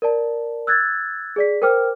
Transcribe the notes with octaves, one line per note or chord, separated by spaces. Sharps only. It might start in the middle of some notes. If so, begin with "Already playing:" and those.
A#4 D5 A5
E6 F#6 G#6 A6
G#4 D5 B6
A#4 C5 G5 D6 F6